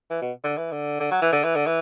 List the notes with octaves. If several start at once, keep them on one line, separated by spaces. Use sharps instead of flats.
E3
B2
D3
E3
D3
D3
F#3
E3
D3
E3
D3
E3